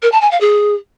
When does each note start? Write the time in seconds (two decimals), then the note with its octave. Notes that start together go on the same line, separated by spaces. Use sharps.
0.02 A#4
0.12 A5
0.21 G#5
0.31 F5
0.40 G#4